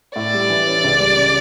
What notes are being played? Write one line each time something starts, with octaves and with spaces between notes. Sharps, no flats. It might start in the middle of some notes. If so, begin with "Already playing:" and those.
A2 D5
G3
E3
C#4
C#2
G3
C#3